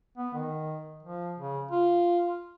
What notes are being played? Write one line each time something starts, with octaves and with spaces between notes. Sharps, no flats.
B3
D#3
F3
C#3
F4